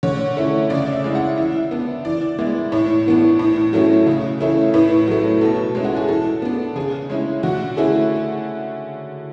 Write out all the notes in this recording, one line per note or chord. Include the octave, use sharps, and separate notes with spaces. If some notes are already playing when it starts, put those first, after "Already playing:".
D3 C#5
A3 C#4 E4
C#3 D5
E5
G#3 C#4 E4
F#5
E3 E5
B3 D4
E3 D5
G#3 B3 E4
A2 C#5
E3 B3 D4
A2
F#3 A3 C#4 E4
C#3
E3 A3 C#4 E4
A2 B4
F#3 A3
B2 A4
G#3 C#4 E4
F#4
G#4
E3 A4
B3 D4
C#3 G#4
G#3 C#4 E4
D3 F#4
A3 C#4 E4 G#4